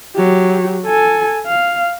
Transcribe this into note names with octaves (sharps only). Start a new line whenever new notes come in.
F#3 G4
A4 G#5
F5